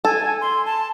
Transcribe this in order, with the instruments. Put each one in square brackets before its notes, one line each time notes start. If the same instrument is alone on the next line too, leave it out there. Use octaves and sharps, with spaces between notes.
[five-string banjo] A4 [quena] G#5
[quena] C6
A5